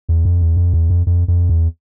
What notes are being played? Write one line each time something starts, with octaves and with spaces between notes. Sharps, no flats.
E2
F2
E2
F2
E2
F2
F2
F2
E2